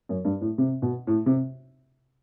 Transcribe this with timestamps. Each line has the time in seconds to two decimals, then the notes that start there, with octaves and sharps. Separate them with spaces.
0.09 F#2
0.25 G2
0.41 A2
0.58 C3
0.82 B2
1.07 A2
1.26 C3